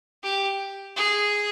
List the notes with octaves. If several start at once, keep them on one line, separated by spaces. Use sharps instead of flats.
G4
G#4